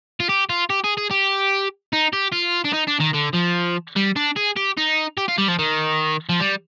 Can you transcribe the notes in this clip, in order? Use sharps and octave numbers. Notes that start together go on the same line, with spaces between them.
F4
G4
F4
G4
G#4
G#4
G4
D#4
G4
F4
D4
D#4
D4
D#3
D3
F3
G3
D4
G#4
G4
D#4
G4
F4
G3
F3
D#3
F3
G3